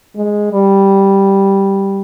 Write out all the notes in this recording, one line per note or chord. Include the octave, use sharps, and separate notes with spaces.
G#3
G3